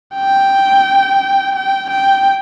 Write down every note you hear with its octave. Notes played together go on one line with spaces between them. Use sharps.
G5
G5
G5